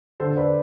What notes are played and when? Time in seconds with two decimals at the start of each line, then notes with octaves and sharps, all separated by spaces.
0.20 D3 A4 C5
0.37 B4 D5